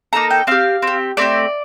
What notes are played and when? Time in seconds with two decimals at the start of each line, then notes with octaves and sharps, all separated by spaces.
0.13 A#3 D#4 A4 A#5
0.30 G5
0.47 C4 G4 F5
0.82 C4 G4
1.17 A3 C4 G4 D5